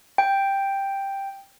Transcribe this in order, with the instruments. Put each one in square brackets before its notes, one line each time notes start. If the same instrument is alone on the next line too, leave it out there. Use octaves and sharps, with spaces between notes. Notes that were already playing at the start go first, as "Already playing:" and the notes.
[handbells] G5